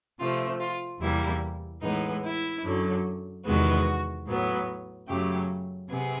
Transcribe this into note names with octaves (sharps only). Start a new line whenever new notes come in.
C3 F3 A3 F4
F4
E2 C3 E3 G3 A#3 E4
A2 E3 G#3 B3 D#4
E4
F#2 D3 F#3
E2 C3 D#3 G#3 B3 F#4
A2 F#3 B3
F#2 C#3 F#3 A3 G4
C3 B3 G#4